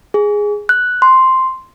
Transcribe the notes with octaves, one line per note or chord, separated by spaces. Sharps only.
G#4
F#6
C6